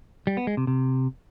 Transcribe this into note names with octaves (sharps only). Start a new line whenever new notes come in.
G3
B3
G#3
C3
C3